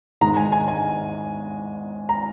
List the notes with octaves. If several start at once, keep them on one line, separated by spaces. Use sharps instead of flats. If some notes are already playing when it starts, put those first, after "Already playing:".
G#2 D#3 G#3 A#5
G#5
G#5
G#5
A#5